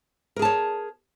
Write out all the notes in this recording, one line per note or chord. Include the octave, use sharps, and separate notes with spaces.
G#4 A#4 C#5 A5